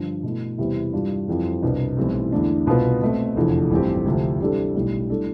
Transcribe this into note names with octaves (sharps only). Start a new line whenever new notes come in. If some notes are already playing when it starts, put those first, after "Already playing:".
Already playing: G2 D3 F3
B2 A3 E4
E2 C3 G3 B3 E4
G2 E3 G3 D4 F4
F2 E3 G3 C4 F4
C2 B2 B3 D4
B1 A2 E3 G3 C4
E2 D3 A3 D4
C2 B2 B3 F4 B4
B2 A3 C4
F1 E2 D3 F3
A1 G2 F3 C4 G4
D2 C3 F3
C3 E3 G3 D4 A4
B1 A2 G3
A2 G3 D4 A4